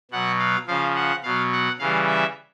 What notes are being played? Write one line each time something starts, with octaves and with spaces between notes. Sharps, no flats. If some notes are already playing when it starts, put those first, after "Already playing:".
B2 F#3 F#5
F5
C#3 F3 F5
F#5
B2 F#3 F5
F#5
C#3 E3 G3 F5
E5